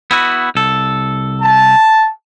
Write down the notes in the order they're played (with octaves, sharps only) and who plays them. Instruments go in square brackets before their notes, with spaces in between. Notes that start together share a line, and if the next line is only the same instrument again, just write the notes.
[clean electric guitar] B3 E4 F#4
C2 A4
[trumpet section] A5